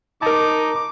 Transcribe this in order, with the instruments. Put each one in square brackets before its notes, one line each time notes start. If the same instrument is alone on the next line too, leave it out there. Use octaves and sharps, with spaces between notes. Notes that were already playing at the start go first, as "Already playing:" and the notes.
[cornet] D#4 [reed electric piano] A#4 A5 [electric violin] D6